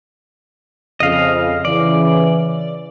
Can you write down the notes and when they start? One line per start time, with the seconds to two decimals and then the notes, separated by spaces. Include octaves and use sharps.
1.00 F2 C#3 D#5 F5
1.65 C#3 E3 D5